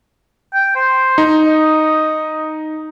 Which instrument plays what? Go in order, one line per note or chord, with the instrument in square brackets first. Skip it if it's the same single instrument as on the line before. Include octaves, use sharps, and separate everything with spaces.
[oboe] G5
C5
[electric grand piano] D#4
[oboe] D#5